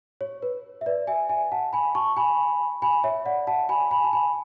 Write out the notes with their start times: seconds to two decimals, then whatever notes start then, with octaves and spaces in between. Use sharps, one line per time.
0.21 C#5
0.42 B4
0.81 E5
0.86 B4 D5
1.07 E5 G#5
1.29 E5 G#5
1.52 F#5 A5
1.73 G#5 B5
1.95 A5 C#6
2.17 G#5 B5
2.82 G#5 B5
3.04 C#5 E5
3.26 D5 F#5
3.47 F#5 A5
3.69 G#5 B5
3.91 G#5 B5
4.04 A5
4.13 G#5 B5